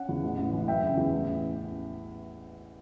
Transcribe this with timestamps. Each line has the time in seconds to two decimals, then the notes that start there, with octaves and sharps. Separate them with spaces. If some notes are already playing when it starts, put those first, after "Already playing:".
Already playing: C#4 F#5
0.09 E2
0.23 A1
0.38 A1
0.53 E3
0.67 F#1 E5 G5
0.82 C#3
0.97 E2
1.13 A1